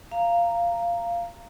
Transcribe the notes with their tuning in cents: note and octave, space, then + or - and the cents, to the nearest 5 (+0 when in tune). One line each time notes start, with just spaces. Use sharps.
F5 -15 A#5 -5